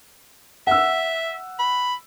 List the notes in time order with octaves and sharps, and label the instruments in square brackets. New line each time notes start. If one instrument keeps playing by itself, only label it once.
[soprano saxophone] E5 [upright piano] F#5 E6
[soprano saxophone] B5